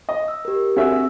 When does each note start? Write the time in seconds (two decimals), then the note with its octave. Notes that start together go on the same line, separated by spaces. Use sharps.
0.09 D#5
0.28 E6
0.45 G4 A#4
0.76 C4 D4 F#4 G#4 E5 E6